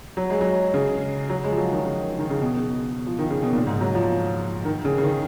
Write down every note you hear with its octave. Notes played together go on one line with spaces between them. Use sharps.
F#3
G#3
F#3
C#3
F#3
G#3
F3
F#3
D#3
C#3
D#3
C#3
B2
F3
D#3
C#3
B2
A#2
G#2
F#3
F3
D#3
C#3
C#3
D#3